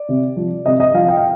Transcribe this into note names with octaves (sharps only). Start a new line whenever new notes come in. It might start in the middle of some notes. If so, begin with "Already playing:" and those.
Already playing: D5
C3
F3
C3 D#5
D#5
F3 F5
G5
F5